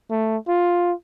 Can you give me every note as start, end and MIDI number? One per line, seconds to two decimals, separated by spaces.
0.10 0.37 57
0.48 0.93 65